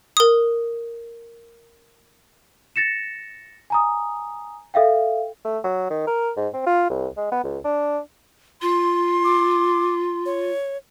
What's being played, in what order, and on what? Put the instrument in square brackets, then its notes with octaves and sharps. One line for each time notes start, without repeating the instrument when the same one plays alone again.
[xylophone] A#4 D#6
[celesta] A6 A#6 C#7 E7
G#5 A#5 D#6
A4 E5 F5 G5
[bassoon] A3
F#3
D#3
A#4
G#2
C4
F4
C2
G#3
B3
C#2
D4
[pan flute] F4 [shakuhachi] C6
[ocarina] D6
C#5